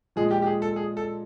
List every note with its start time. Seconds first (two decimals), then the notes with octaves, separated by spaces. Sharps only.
0.16 A#2 F3 G#3 G#4
0.31 G4
0.42 G4
0.46 G#4
0.62 A4
0.76 G#4
0.97 A4